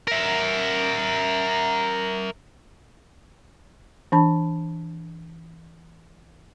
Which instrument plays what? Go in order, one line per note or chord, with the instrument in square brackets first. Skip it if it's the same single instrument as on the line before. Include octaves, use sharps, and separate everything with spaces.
[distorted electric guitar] A#4 E5
[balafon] E3 D4 A5 B5